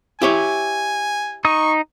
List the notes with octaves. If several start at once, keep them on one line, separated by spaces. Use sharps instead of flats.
E4 G4 C#5 G#5
D#4 C#6 D#6